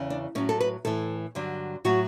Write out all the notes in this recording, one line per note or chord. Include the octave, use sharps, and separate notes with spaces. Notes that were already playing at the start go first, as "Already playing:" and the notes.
Already playing: E2 C#3 E3
D4
A2 F#3 C#4
A4
B4
A2 E3 A4
G2 D3 F#3
A2 F#3 F#4